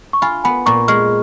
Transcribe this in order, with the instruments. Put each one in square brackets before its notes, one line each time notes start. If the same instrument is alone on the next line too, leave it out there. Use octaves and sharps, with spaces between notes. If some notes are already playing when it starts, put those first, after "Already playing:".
[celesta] C#6
[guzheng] F4 [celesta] G#5 B5
[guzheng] B3 [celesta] G#5 B5
[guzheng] A#2 [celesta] A#5 C#6
[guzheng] G#3 [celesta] C#6 F6